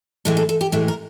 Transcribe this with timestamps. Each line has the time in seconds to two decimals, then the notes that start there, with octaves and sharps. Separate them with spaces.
0.25 A2 E3 G#3 A4
0.37 A4
0.49 A4
0.61 G4
0.72 A2 E3 G#3 A4
0.88 A#4